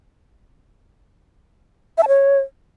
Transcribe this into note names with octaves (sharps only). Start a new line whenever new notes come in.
E5
A5
C#5